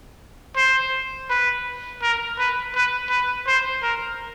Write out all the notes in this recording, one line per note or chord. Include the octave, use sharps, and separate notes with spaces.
C5
B4
A#4
B4
B4
B4
C5
A#4